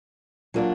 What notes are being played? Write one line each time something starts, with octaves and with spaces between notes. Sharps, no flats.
A#2 F#3 A#3 D4